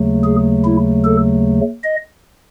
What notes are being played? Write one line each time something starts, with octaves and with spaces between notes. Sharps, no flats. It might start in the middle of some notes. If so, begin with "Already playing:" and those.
Already playing: D#2 C#3 F#3 A3
G#4
E4
A4
D#5